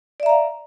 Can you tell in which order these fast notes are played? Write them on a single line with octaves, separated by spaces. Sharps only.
D5 E5 A#5 F5